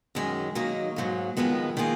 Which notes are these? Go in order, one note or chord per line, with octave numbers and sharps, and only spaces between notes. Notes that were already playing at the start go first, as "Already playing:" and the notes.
F#2 D#3 G#3 C#4
D#3 F#3 A#3 D#4
G#2 F#3 A#3
F2 D#3 G#3 B3 D#4
D#3 A#3 F4 G#4